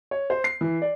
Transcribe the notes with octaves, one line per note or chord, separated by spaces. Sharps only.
C#5
C5
C7
E3
D5